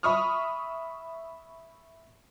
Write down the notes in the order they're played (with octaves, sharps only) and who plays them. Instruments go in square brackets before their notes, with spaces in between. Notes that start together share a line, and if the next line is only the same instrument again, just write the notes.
[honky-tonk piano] E5 B5 C#6 D#6 F6